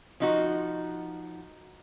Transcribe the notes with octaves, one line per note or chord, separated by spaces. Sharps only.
F3 D#4 F#4